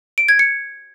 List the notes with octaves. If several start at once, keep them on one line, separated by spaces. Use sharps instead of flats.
D7
G#6
C#7